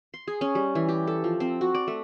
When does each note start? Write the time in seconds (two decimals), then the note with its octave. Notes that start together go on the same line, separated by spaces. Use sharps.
0.14 C6
0.28 G#4
0.41 C#4
0.55 G3
0.75 E3
0.89 G4
1.07 A4
1.24 F3
1.40 C4
1.61 F#4
1.75 D5
1.88 A3